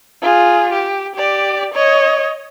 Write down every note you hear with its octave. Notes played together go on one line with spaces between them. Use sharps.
F4 G#4
G4
G4 D5
C#5 D#5